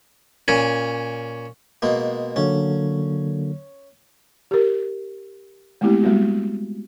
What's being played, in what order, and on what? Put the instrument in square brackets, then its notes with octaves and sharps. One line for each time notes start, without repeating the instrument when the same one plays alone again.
[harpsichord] A#2 C#4
B2 G#3 A#3
[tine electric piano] D3 F#3 A#3 [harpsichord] C#4
[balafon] G4 A#4
G#3 A3 B3 C4 E4 G4
G3 G#3 B3 F#4